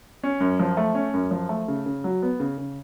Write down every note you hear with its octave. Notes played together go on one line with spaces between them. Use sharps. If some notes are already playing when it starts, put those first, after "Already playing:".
C#4
F#2
F3
A3
C#4
F#2
F3
A3
C#3
C#3
F#3
B3
C#3
C#3